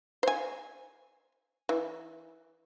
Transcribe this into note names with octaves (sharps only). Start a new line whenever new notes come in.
C5 G#5
E3